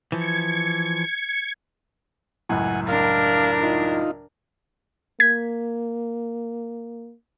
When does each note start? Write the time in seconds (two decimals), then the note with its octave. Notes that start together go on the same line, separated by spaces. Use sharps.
0.12 E3 F3 G#6 C#7
2.49 C#2 F#2 A2 F#5 G#5
2.88 D4 A#4 F5
3.63 D#4 F4
5.20 A#3 G#6 B6